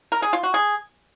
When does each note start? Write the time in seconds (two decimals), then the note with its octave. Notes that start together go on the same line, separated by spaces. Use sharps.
0.12 A#4
0.22 G#4
0.33 F4
0.43 F#4
0.54 G#4